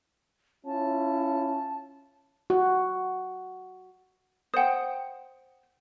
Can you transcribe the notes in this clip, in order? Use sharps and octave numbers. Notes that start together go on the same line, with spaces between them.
C#4 E4 F4 A5
F#4
C5 F#5 G5 D#6